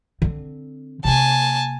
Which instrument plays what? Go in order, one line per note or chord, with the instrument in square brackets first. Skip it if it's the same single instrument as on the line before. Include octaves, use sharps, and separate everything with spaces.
[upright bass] D3 C4
[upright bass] C3 A#3 [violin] G#5 A5